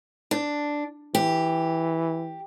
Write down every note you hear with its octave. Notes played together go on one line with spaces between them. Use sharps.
D4
E3 G4